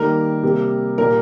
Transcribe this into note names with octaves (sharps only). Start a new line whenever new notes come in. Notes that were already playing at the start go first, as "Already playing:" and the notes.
Already playing: D#3 G3 A#3 A#4
C3 G3 A#3
A#2 G3 A#3 A#4